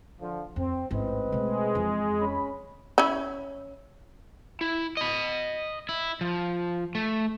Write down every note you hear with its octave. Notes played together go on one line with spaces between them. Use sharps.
D3 F3
F2 C4
A1 G#2 C4 B4 D#5
B2 G#3 A3
F2 E3
C#4 B5
C#4 E4
E4
D#5 B5
E4
F3
A3